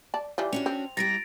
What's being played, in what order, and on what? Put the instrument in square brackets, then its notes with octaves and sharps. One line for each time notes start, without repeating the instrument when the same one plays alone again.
[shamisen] D5 A5
E3 G3 F4
[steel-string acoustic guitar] C#4 D4 F#4 [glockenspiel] F7
[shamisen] C4
[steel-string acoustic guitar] G3 E4 G4 [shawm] A#5 [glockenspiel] A6 A#6 D7